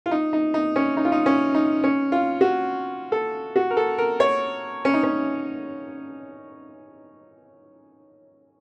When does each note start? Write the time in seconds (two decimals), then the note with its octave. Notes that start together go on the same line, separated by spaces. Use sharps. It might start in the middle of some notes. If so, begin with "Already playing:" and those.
0.06 F4
0.11 D#4
0.33 D#4
0.54 D#4
0.76 C#4
0.97 D#4
1.05 F4
1.12 D#4
1.26 C#4
1.55 D#4
1.84 C#4
2.12 F4
2.41 F#4
3.12 A4
3.56 F#4
3.70 A#4
3.77 A4
3.98 A#4
4.20 C#5
4.85 C#4
4.94 D#4
5.03 C#4